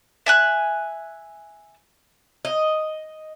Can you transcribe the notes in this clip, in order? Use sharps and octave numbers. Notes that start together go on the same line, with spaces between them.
E5 G#5 F#6
D#5